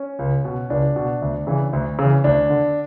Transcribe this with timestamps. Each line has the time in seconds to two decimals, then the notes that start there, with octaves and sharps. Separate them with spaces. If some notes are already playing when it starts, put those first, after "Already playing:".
Already playing: C#4
0.19 C#2
0.45 B2
0.70 C#2 D4
0.96 B2
1.22 D2
1.47 C#3 E3
1.73 D2
1.99 C#3 E3
2.24 D2 D4
2.50 D3